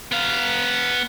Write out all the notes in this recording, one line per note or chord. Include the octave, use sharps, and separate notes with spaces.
B3 F5